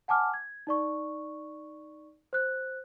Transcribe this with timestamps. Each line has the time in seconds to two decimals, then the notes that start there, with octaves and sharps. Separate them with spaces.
0.08 F#5 G#5 A5 D6 F6
0.34 G#6
0.67 D#4 D5 C#6
2.33 C5 F#6